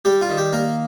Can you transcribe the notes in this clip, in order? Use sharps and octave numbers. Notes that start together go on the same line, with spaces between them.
G3 G4
F4
D#3
G4
A#3 A#4